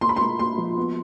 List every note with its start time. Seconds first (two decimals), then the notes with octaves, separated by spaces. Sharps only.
0.01 A#3 C6
0.09 B5
0.16 A#3 C6
0.39 A#3 C6
0.58 F3
0.77 B3